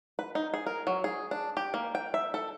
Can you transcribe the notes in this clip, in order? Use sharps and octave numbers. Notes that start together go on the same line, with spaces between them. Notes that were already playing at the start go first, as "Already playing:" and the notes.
B4
D#4
G#4
A#4
F#3
G#4
D4
G4
A#3
G5
E5
A4